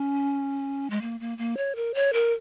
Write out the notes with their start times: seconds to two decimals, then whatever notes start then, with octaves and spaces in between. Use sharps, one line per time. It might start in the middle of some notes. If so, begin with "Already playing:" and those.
Already playing: C#4
0.90 G#3
1.01 A#3
1.20 A#3
1.38 A#3
1.57 C#5
1.75 A#4
1.94 C#5
2.13 A#4